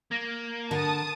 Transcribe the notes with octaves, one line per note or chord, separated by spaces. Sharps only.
A#3 G#6 A#6
D3 A#4 A5 D#6